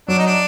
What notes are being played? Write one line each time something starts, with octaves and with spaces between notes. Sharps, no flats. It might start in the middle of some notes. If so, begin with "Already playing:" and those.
F#3 D4
D#4
D4